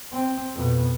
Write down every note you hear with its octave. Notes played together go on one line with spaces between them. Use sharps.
C4
F2 B2